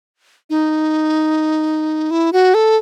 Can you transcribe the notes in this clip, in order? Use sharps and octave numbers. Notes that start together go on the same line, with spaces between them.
D#4
E4
F#4
A4